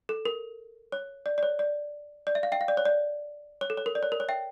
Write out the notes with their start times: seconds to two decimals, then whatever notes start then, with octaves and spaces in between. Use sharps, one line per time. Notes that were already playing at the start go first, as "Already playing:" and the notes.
0.09 A4
0.25 A#4
0.92 C#5
1.26 D5
1.38 D5
1.43 C#5
1.59 D5
2.27 D5
2.35 E5
2.43 F5
2.52 E5 G5
2.61 F5
2.68 D5
2.77 C#5
2.85 D5
3.61 C#5
3.70 A4
3.77 C#5
3.86 A#4
3.95 D5
4.03 C#5
4.12 A#4
4.20 C#5
4.29 E5 G5